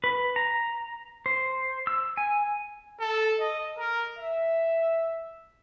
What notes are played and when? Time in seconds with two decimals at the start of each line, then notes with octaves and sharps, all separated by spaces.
0.04 B4
0.36 A#5
1.26 C5
1.87 E6
2.17 G#5
2.99 A4
3.40 D#5
3.76 A#4
4.18 E5